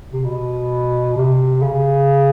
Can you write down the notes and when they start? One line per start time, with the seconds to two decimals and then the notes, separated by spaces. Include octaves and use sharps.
0.13 C3
0.24 B2
1.17 C3
1.62 C#3